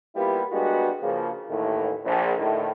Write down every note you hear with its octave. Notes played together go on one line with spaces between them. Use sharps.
G3 A#3 B3 E4 F4 G4
G3 G#3 A#3 B3 D4 F#4
C#3 F3 A#3
A1 D#2 A2
A#1
A2 D3 D#3